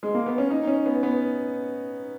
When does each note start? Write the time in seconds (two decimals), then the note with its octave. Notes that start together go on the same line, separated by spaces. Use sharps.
0.03 G#3
0.15 A#3
0.26 B3
0.38 C#4
0.50 D#4
0.67 C#4
0.86 B3
1.03 B3